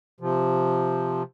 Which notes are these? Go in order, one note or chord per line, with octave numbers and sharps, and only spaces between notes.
C3 F3